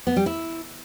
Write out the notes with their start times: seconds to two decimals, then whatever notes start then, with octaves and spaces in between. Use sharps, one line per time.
0.07 B3
0.16 G3
0.26 E4